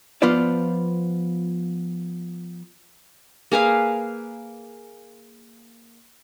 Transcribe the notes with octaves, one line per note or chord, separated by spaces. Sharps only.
F3 B3 F4 B4 C5 D5
A#3 G#4 B4 F5